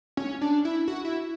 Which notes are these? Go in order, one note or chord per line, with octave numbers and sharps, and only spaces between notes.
C#4
D4
E4
F#4
E4